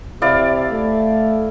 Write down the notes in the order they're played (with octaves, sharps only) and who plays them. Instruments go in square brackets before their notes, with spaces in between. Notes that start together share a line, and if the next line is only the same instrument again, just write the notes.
[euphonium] C3 [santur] E4 D5 F5
[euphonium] A3